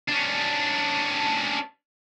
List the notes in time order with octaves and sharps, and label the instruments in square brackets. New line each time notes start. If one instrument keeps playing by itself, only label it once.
[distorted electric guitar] C#4 D4